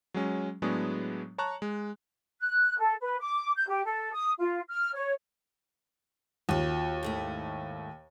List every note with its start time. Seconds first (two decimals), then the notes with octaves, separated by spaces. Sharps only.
0.14 F#3 G#3 C#4
0.62 A2 F#3 G#3 B3 D4 G#4
1.38 C#5 A5 A#5 C#6 F#6
1.62 G#3
2.40 F#6
2.78 A4
3.00 B4
3.19 D6
3.55 G6
3.68 G4
3.84 A4
4.13 D#6
4.38 F4
4.68 F6
4.93 C#5
6.49 D#2 F4 F#4
7.03 G#2 A3 E4